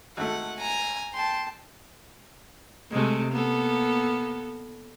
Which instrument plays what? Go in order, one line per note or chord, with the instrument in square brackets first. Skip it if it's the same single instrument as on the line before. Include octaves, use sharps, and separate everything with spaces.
[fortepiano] G#1 A3 [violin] F#5
[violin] G#5 A#5
[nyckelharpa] G5 A5 [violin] C6
[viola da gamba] C3 G#3 A3
A#3 B3 A4